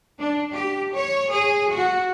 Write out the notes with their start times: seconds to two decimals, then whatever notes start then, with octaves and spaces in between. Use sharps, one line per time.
0.19 D4
0.53 G4
0.94 C#5
1.31 G#4
1.71 F#4